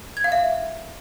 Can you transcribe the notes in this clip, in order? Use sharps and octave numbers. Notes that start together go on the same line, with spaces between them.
G#6
F5
E5